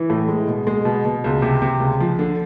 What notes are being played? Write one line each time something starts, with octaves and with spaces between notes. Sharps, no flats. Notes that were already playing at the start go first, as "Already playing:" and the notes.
Already playing: E3
A2
G#3
B2
G#3
B2
B2
C#2
C3
C3
C#2
F3
D3